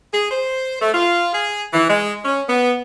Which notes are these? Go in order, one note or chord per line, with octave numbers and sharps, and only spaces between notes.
G#4
C5
A3
F4
G#4
E3
G#3
C#4
B3